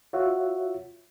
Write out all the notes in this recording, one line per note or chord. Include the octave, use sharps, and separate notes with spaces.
F4 F#4 C#5 E5 F#5